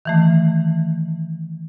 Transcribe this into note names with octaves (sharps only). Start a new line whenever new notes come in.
D#3 E3 A3